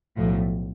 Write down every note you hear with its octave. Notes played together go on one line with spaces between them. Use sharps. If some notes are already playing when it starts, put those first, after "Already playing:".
B1 A2 F3